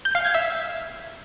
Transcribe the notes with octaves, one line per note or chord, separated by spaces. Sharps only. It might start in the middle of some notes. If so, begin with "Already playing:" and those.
G6
F5
G#6
E5